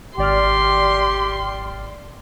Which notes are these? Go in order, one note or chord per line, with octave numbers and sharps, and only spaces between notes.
G#1 G4 D5 C6 F6